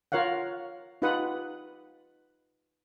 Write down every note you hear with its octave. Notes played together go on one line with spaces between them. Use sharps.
F4 A#4 C#5 F5 F#5
D#4 F4 G4 B4 F#5 D#6